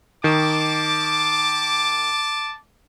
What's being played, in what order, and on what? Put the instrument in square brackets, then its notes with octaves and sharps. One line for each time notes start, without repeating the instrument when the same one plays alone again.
[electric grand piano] D#3 [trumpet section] A5 D6